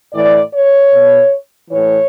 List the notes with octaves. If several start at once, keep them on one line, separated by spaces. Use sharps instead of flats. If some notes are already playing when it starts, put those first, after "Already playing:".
A2 E3 D5
C#5
B2
A2 E3 C#5